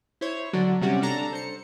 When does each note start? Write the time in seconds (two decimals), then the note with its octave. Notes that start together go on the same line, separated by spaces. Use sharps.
0.21 E4 C5 C#5
0.53 D3 F#3 D4
0.81 C3 G3 C#4 F#4 G4
1.02 D4 A4 A5 A#5
1.33 C5 C#7